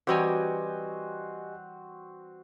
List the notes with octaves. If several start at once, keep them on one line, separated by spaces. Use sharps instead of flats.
E3 G3 C4 F#4 G4 C#5 D#5 G#5